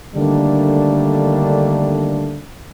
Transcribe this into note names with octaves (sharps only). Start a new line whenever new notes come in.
D3 D#3 G3 A3 A#3 D4